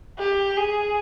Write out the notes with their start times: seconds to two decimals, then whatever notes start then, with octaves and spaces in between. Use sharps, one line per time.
0.19 G4
0.57 G#4